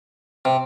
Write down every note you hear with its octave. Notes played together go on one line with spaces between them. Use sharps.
C3